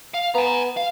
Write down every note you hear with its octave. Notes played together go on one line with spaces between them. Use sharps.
F5
B3 G#5 A#5
F5